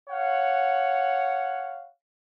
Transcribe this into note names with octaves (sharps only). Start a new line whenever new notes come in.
C#5 F5 F#5